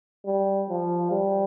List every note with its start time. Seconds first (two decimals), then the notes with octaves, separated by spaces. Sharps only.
0.25 G3
0.69 F3
1.11 G3